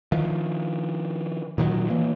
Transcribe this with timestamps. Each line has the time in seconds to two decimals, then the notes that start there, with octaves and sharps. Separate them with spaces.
0.12 D#3 F3
1.58 A#2 D#3 E3 F#3
1.90 E3 A#3